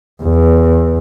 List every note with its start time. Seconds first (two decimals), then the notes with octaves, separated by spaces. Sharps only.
0.24 E2